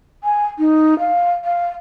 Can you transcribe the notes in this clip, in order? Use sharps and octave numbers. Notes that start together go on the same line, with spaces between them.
G#5
D#4
F5
F5